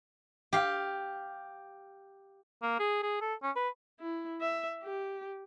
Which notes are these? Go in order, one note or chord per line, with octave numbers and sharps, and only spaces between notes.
G4 F5
A#3
G#4
G#4
A4
C#4
B4
E4
E5
G4